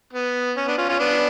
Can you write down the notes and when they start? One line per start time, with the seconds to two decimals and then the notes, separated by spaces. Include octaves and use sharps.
0.13 B3
0.57 C#4
0.67 B3 D4
0.78 C#4 F4
0.89 C#4 F4
0.99 B3 D4